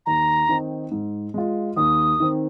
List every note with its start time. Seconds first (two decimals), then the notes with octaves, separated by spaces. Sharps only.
0.06 D#2 A#5
0.49 D#3 C4 D#4
0.91 G#2
1.34 G#3 F4
1.77 D#2 D#6
2.20 D#3 C4